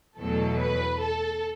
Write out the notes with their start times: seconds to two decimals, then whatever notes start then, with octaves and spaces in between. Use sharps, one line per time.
0.18 E2 B2 F#3 A3 A4
0.59 B4
1.00 A4